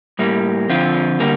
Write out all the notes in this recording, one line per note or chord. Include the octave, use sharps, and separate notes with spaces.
A2 G3 A#3
D3 F3 C4 F4
D3 G3 A#3